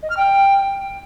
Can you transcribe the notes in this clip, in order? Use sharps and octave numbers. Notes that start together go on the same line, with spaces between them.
D#5
F6
G5